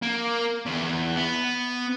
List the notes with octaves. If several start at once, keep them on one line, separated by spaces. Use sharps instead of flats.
A#3
E2
B3